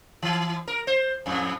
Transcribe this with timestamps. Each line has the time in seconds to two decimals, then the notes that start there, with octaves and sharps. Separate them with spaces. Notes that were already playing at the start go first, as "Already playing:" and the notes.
0.22 E3
0.68 A#4
0.87 C5
1.26 F2 A2